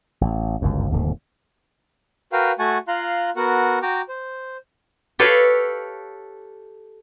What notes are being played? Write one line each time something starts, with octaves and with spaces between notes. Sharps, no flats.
A1
G1 C#2 F#2
D1 D#2 G#2 C3
F#4 A#4 B4 F5 G5
A3 F#4 F#5 G#5 A5 C#6
F4 F5 A#5 C6 F#6
B3 F#4 A#4 F#5
F#4 G5 A#5 D6
C5
G4 A4 B4 C#5 F5